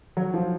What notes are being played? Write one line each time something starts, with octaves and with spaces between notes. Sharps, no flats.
F#3
F3